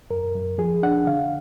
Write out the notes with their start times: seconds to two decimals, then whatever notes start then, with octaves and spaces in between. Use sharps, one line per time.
0.10 F#2 A#4
0.35 F#2
0.58 F3 G#4
0.83 D4 F#5
1.07 D3 F5